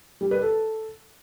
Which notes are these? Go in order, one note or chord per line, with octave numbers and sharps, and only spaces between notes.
G3
B4
A4